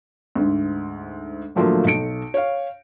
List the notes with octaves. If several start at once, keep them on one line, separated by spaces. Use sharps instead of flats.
D2 G#2
A2 D3 F3 F#3 A3 A#3
B1 A4 C#7 D7
C#5 F5